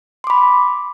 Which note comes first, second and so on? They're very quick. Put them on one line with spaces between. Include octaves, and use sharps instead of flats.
C6 D6 B5